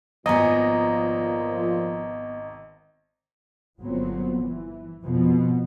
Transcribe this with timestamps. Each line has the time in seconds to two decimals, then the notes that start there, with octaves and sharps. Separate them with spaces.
0.26 G#1 A#2 F3 B3 D#5 G#5 A#5
3.79 G1 A#2 F#3 B3 C4
4.40 E3
5.02 F2 B2